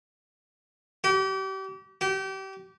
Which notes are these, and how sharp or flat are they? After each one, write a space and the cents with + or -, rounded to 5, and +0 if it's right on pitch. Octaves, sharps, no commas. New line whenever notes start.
G4 -35
G4 -30